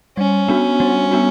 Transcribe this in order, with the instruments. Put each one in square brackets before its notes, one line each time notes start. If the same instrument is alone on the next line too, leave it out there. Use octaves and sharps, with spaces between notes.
[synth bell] G3 [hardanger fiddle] C#4
[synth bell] B3 D4 F#4
G3
B3 D4 F#4